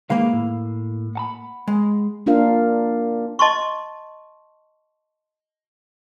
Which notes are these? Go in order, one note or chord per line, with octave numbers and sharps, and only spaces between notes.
D#3 G#3 A#3 B4 F5
A2
F#5 A5 B5
G#3
A#3 D4 F4 A#4 F5
D#5 A5 C6 C#6